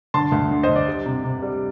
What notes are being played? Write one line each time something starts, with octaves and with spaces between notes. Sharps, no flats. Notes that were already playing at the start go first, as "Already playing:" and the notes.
D3 A5 C6
D2
D3
C5 D#5
D3
D5
G3
C3
C3
G3